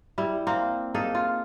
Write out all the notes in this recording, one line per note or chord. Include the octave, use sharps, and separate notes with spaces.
G3 E4
A#3 C4
A#3 D#4 G#4 A4
F4